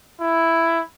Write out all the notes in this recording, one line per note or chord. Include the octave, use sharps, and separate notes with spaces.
E4